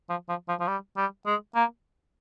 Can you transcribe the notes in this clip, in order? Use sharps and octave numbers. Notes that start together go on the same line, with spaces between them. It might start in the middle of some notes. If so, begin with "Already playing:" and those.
F3
F3
F3
F3
G3
G3
G#3
A#3